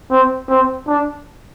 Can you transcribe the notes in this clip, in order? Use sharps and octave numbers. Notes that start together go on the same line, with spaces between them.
C4
C4
D4